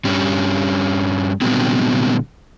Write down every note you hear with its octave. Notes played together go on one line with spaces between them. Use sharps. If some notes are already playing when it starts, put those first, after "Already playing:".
G2 G3 C#4
A#2 D3 F#3 G3 B3 C4